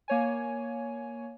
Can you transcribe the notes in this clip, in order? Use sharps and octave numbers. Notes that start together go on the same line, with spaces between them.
A#3 C#5 G#5